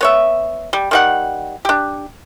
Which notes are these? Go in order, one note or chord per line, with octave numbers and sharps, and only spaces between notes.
B3 C#5 E5
G3
D#3 G3 F#5
D4 G4